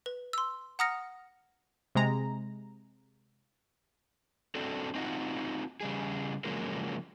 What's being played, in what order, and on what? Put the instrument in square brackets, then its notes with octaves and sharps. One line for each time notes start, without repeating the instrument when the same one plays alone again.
[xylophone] B4
C6 E6
F#5 A#5 D#6 F6 A#6 C#7
[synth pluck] C3 G#3 A#5
[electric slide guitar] C4 D4 F#4 A4
C4 D#4 F4 F#4
C#3 G3 G#4
C#3 F3 F#3 G#3 A#3